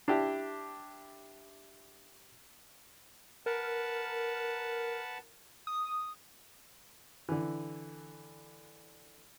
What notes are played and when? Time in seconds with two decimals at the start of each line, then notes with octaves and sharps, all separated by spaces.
0.08 D4 E4 G4
3.46 A#4 B4 F#5 A5
5.67 D#6
7.29 D3 E3